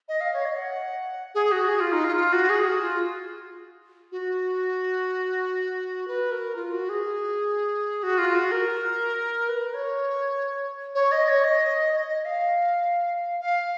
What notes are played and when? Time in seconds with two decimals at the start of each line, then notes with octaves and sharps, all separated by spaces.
0.09 D#5
0.21 F5
0.34 C#5
0.46 D#5
0.58 F#5
1.35 G#4
1.52 F#4
1.68 G#4
1.80 F4
1.93 D#4
2.04 F4
2.16 F4
2.33 F#4
2.50 G#4
2.65 F#4
2.81 F4
4.12 F#4
6.08 B4
6.31 A#4
6.56 F4
6.72 F#4
6.89 G#4
8.03 F#4
8.18 F4
8.35 F#4
8.52 A#4
9.49 B4
9.74 C#5
10.95 C#5
11.12 D#5
11.29 C#5
11.44 D#5
11.93 D#5
12.09 D#5
12.25 F5
13.40 F5